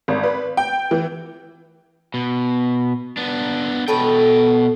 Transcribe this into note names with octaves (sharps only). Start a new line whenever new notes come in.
G#1
B4
G5
E3
B2
B3 D4
B2 A4 B4 C#5 G5